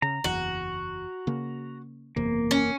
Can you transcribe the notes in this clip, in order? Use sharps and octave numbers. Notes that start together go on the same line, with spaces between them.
C#3 A#5
F#1 E2 F#4
C#3 A#3
F#1 E2 C3 A#3
C#4